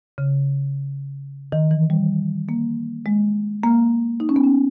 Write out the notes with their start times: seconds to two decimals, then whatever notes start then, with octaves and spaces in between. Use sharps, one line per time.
0.18 C#3
1.52 D#3
1.71 E3
1.90 G3
2.49 A#3
3.06 G#3
3.63 A#3
4.20 D#4
4.29 C#4
4.36 B3
4.44 C#4